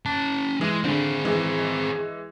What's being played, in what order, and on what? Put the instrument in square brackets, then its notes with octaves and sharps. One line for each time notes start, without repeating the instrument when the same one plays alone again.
[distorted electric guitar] C#4 A5
[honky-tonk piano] E3 [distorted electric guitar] G#3
[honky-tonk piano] D3 [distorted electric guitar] C4 G#4
[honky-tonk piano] E3 G#3